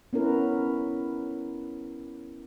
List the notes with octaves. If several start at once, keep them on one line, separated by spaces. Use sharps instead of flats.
B3 C#4 E4 A#4 B4